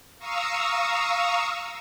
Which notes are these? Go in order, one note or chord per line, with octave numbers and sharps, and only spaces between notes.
F5 A#5 C#6 D#6 E6